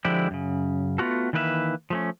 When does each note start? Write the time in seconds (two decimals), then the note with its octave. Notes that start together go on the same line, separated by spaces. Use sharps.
0.05 D3 F3 G#3 E4 G4 D5
0.31 F#2 C#3
0.98 A3 B3 C4 F4 F#4 A4
1.33 D#3 E3 A#3 B4 D#5 E5
1.90 F3 A3 C#4